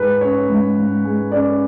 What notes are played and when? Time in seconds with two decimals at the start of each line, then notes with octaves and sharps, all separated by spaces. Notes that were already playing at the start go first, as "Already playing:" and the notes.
Already playing: G#2 G#3 B4
0.21 C#4 C#5
0.49 G#2
0.77 G#2
1.04 G#3
1.31 C#4 D5